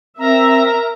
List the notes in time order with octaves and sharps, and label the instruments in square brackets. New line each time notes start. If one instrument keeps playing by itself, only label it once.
[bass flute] C4 [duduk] A#4 [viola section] E5 [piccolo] A#5